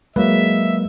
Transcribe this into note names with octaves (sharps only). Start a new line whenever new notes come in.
F#3 G#3 A#3 B4 E5